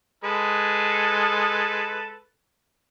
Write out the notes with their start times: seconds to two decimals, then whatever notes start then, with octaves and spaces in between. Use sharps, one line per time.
0.24 G#3 A4 B4